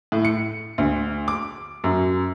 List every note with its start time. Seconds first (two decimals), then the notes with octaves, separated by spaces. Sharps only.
0.12 A2
0.25 C#7
0.78 D2
1.28 D6
1.84 F#2